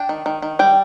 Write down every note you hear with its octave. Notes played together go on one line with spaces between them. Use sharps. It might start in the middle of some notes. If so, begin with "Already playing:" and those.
Already playing: D4 G5
D#3
D#3
D#3
G3 G5